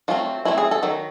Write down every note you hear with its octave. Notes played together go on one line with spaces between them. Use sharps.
F#3 A3 C4 F4
F#3 A3 C4 E4
G#4
A4
D#3 F#3